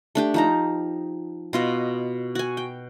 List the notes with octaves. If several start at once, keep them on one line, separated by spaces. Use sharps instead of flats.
A3 D4 G4
F3 D#4 A#5
B2 F4 D#5
F#4 G#5
G5